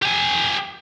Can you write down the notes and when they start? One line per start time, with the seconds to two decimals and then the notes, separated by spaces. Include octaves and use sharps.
0.02 G4 G#5